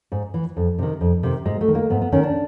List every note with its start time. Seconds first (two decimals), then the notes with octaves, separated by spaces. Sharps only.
0.12 G#2
0.34 E3
0.57 F2
0.78 C3 D#3
1.01 F2
1.23 C3 D#3
1.45 G#2 G#3
1.61 A3
1.68 D#3
1.75 A#3
1.90 G#2 B3
2.01 B3
2.12 D#3 C#4
2.23 D4